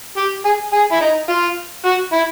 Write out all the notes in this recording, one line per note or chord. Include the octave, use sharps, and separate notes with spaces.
G4
G#4
G#4
E4
D#4
F4
F#4
E4